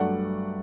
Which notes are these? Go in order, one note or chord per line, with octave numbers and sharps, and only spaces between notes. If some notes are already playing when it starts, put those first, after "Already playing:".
Already playing: G2 F#3 A3 D5 F#5